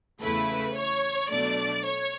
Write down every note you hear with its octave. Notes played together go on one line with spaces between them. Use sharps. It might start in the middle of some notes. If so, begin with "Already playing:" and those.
E2 C#3 E3 A3 E4 B4
C#5
B2 F#3 A3 D4 D5
C#5